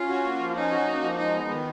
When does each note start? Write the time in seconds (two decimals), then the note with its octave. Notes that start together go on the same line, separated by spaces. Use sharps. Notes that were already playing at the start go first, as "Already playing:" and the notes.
Already playing: C#4 F4
0.09 F#4
0.24 A#3
0.40 F3
0.56 C#4 D#4
0.71 F#4
0.87 A#3
1.03 F3
1.19 G#3 D#4
1.34 B3
1.50 D#3